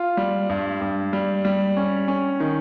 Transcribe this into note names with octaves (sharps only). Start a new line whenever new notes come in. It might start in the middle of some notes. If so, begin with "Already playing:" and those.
Already playing: F4
G3
G2
G2
G3
G3
C#4
C#4
D#3